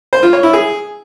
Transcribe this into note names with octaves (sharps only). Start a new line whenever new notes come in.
C5
F4
C#5
E4
G#4